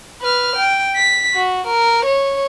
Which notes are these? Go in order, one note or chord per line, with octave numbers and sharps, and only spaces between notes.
B4 F6
G5
B6
F#4
A#4
C#5